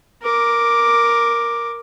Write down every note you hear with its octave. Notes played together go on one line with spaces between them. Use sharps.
A#4 D6